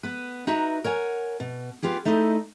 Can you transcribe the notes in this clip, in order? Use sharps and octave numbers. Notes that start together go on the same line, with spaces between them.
B3 B4
D#4 F#4 B4 E5 A#5
A#4 C#5 F#5 G#5
B2
B3 F4 G4 G#4
A3 D#4 E4 C5 C#5 D#5